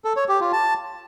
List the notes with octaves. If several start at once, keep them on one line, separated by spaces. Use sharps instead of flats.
A4
C#5
G4
F4
A5